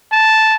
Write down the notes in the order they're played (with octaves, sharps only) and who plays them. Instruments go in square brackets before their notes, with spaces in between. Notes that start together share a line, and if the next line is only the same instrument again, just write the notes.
[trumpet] A5